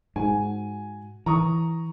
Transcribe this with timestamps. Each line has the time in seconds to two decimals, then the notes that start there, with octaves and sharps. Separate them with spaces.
0.16 G#2 F#4 G#5
1.26 E3 A#5 C#6 D#6